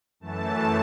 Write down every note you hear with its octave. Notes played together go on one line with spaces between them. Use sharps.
F#2 E3 A3 A5